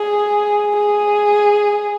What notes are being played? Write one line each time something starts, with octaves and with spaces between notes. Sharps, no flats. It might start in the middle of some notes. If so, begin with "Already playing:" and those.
Already playing: G#4
G#4